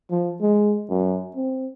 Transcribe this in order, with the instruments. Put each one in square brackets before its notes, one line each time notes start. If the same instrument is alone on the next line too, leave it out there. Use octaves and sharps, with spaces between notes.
[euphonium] F3
G#3
F#2
C4